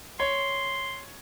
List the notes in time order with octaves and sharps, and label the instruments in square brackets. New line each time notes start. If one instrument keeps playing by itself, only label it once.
[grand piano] C#5 [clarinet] C6